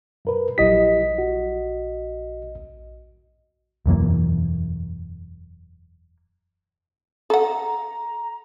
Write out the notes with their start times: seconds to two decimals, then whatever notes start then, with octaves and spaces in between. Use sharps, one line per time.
0.25 F#2 A#4 B4
0.58 A#1 F#3 E4 G4 D#5 B6
1.18 F#4
3.86 E1 F#2 E3 A#3
7.30 A4 F#5 A#5